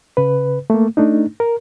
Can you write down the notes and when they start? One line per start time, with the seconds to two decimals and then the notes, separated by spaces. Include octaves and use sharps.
0.17 C#3 B4
0.70 A3 A#3
0.97 A3 D4 D#4
1.40 A#4